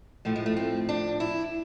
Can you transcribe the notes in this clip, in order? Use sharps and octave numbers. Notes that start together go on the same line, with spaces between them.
A2 F3 A3
G#3
A3
C4
D4
E4